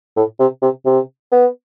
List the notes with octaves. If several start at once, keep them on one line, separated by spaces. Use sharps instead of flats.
A2
C3
C3
C3
B3